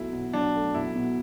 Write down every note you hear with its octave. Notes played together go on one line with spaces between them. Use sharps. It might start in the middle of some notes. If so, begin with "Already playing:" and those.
Already playing: B1 F#3 A3 E4
B2
F#3 D4
A3
B1 E4
B2